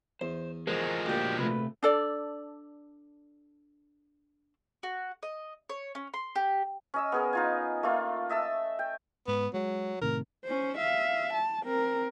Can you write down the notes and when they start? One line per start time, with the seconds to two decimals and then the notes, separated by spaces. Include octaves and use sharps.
0.21 E2 C5
0.67 F3 F#3 G#3 G#4 A#4 C5
1.06 D2 A#2 G4
1.39 C3 A3 B4
1.83 D4 A4 D5
4.83 F#4
5.23 D#5
5.70 C#5
5.95 C#4
6.14 C6
6.36 G4
6.94 C#4 D#5 E6
7.12 B3 G#4 A#4
7.33 D#4 F4 G#5
7.83 A3 A#3 F4
8.29 D#5 E5 A5 E6
8.79 G5
9.28 G#2 B3
9.54 F#3 G#3
10.01 A2 C3 D#3 A#4
10.44 C#4 C5
10.77 E5 F5
11.34 A5
11.63 C4 A#4